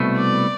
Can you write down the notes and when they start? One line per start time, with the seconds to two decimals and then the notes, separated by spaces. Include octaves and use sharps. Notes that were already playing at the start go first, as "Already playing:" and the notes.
Already playing: C2 B2 A3
0.17 D5